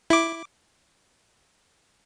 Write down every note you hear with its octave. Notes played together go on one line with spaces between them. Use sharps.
E4 D6